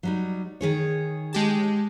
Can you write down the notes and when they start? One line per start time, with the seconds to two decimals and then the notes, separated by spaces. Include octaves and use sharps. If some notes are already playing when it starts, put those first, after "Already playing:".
0.03 F#3 G3 D#4
0.61 D#3 G#4 C#5
1.33 G#3 G4 A5